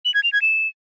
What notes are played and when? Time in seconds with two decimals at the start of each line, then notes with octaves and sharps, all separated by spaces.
0.05 F#7
0.14 G#6
0.23 F7
0.33 G#6
0.42 E7